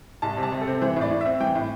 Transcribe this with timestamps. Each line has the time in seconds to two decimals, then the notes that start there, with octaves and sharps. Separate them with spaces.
0.22 C2 A5
0.37 C3
0.43 A5
0.52 C3
0.61 A4
0.67 C4
0.82 E3 C5
0.96 A2 D5
1.11 A2
1.21 C4 E5
1.40 E3 G5
1.55 A2